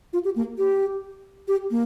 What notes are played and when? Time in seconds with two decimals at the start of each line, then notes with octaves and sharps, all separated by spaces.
0.13 F4
0.25 G4
0.36 A#3
0.58 G4
1.48 G4
1.71 A#3